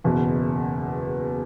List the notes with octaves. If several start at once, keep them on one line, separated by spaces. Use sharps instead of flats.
F#1 E2 B2